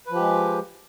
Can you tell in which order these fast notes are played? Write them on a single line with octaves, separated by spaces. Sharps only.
B4 F3 G4 G#3